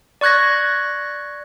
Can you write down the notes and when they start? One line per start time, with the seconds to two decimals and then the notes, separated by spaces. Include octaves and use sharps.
0.21 D5 C#6 F#6 G#6 A#6